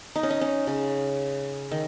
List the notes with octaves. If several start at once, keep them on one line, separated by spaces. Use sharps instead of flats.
D#4
C#4
D#4
C#4
C#3
D#3